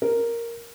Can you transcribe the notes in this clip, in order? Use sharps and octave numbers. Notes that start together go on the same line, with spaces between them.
A#4